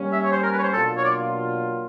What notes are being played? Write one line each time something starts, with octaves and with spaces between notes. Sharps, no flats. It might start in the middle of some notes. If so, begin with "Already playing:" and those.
Already playing: G3 A#3 C#4
E5
C#5
C5
A#4
B4
C#5
C5
B2 F#3 A#3 D4 F4 A4
C#5
D5